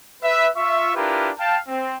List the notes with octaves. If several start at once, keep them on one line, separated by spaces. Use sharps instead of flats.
B4 E5
F4 E5 C#6
D4 E4 F4 G4 A#4 B4
F5 G5 A5
C4